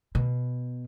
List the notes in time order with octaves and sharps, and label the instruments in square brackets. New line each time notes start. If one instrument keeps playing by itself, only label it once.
[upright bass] B2